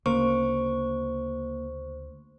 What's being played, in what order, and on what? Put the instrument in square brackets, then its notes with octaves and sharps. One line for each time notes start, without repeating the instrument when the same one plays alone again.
[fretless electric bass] D2 C#3 [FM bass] A#3 [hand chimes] C5 [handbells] C#6